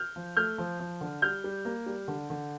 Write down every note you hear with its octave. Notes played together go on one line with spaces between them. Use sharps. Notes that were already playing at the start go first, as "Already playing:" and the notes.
Already playing: F6 G6
F3
A3 F6 G6
F3
F3
D3
G3 F6 G6
G3
A#3
G3
D3
D3